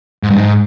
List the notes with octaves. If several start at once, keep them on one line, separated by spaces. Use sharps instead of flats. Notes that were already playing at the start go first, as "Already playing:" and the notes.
G#2
G2
G#2